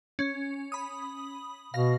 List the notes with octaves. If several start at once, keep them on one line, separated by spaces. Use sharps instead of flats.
C#4
B5 D#6
B2 F5 A#6